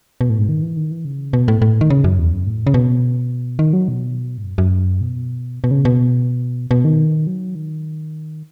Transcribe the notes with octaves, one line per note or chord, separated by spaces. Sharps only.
B2
A2
G#2
D#3
E3
D#3
E3
C#3
B2
A2
A2
D#3
C#3
F#2
E2
F#2
A2
C#3
B2
D#3
F#3
B2
G#2
F#2
F#2
B2
B2
C#3
B2
B2
D#3
F#3
D#3